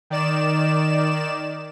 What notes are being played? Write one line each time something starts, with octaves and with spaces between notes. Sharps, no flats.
D#3 D5 E7